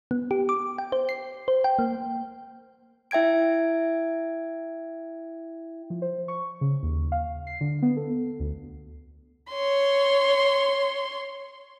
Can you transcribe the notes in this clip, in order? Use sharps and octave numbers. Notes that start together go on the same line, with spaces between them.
B3
G4
D6
G5
C5
C7
C5
G5
A#3
E4 E5 G5 G#6 D7
F3
C5
C#6
C#3
D#2
F5
C7
D3
B3
A4
D2
C#5 C6